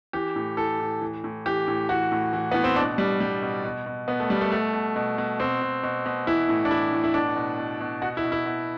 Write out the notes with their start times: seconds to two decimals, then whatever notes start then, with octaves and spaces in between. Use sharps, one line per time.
0.13 E3 G4
0.36 A2
0.57 E3 A4
0.80 A2
1.01 E3
1.24 A2
1.46 E3 G4
1.68 A2
1.89 E3 F#4
2.12 A2
2.33 E3
2.52 A2 B3
2.64 C4
2.76 B2 D4
2.98 B2 G3
3.20 B2 G3
3.42 B2
3.64 B2
3.86 B2
4.08 B2 B3
4.20 A3
4.29 B2 G3
4.41 A3
4.52 B2 A3
4.73 B2
4.96 B2
5.18 B2
5.40 B2 C4
5.62 B2
5.83 B2
6.06 B2
6.27 E3 E4
6.49 A2
6.65 D4
6.71 E3 E4
6.93 A2
7.04 E4
7.14 B2 D4
7.36 B2
7.58 B2
7.81 B2
8.02 B2 F#4
8.17 E4
8.24 B2
8.32 E4
8.46 B2